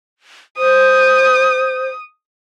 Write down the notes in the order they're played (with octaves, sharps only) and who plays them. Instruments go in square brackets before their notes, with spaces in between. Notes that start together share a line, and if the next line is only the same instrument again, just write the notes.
[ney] C5 [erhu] D#6